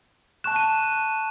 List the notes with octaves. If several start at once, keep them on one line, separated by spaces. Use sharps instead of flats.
A5 C#6 F#6 E7
D#7